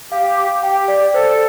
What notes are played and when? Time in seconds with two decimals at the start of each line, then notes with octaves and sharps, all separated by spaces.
0.11 G4 F5
0.37 D6
0.63 G4 G5
0.88 D5
1.14 A4 C5